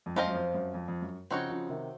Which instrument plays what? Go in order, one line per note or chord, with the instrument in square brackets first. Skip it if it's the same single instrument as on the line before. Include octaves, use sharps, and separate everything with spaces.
[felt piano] F2
[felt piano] F#2 [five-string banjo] F3 C4 F4 C5 D#5
[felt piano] F#2
F2
F#2
F2
F2
F#2
[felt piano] C#3 F3 [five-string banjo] C4 D#4 F#4 C#5
[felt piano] C#3 F3
C3 D#3